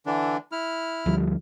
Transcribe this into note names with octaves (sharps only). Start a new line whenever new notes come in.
D3 E3 D4
E4 F6
D2 F3 G3